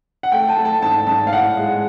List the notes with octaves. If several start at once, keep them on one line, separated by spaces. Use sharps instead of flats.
F#5
A3 G5
A5
A3
A5
G#2 A5
G#2 A5
F5
A2 F#5
G#3